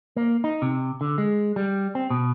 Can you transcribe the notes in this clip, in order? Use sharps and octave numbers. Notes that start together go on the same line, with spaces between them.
A#3
D#4
C3
D3
G#3
G3
C4
B2